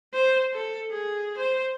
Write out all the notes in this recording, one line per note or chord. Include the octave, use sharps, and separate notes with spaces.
C5
A4
G#4
C5